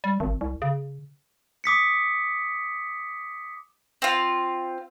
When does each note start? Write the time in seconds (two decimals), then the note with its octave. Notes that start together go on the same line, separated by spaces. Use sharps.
0.04 G3
0.20 G#1
0.41 C2
0.62 C#3
1.64 D6 D#6 B6 C#7
4.02 C4 F4